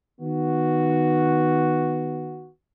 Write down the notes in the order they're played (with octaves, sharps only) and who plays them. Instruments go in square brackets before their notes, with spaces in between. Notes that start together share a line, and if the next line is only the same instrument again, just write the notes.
[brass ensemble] D#3 B3 F#4